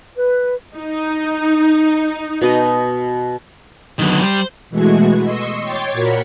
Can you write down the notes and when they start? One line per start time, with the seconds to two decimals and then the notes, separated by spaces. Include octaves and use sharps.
0.18 B4
0.75 D#4
2.41 B2 B4 D#5
3.99 D3 D#3 F#3 B3
4.23 G3 C5
4.70 B2 E3 G#3 A3 F#4 G#6
5.23 D#5 C6 C#6 E6 C#7
5.62 C#5 G5 C6 D6 G#6 A6
5.93 A#2 F#4 A#4 C#5 B5 B6